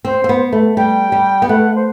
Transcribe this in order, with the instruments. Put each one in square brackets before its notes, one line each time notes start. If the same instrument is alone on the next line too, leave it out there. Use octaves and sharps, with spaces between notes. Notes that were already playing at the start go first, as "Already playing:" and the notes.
[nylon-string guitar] C4 [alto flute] C5
[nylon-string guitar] C4
B3
A3
[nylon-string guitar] G3 [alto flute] G5
[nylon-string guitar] G3
B3
[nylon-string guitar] A3 [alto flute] F#5
[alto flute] C5